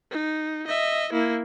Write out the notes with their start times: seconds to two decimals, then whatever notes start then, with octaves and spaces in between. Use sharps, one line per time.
0.11 D#4
0.68 D#5 E5
1.13 A#3 E4